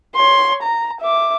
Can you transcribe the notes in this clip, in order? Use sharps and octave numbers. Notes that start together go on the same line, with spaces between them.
C#5 C6
A#5
E5 D6